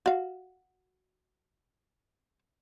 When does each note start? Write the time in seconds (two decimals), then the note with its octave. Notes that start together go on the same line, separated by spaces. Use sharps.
0.06 F#4 F5